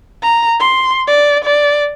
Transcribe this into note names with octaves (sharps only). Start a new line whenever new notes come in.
A#5
C6
D5
D5